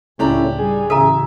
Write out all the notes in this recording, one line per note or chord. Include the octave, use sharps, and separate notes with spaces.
C#2 A2 A3 C#4 D4 E4 G4 A#5
G3 G#4
A1 C#3 A4 E5 A#5